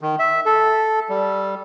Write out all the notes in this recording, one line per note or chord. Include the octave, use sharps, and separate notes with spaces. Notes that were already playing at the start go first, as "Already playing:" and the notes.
D#3
E5
A4
G3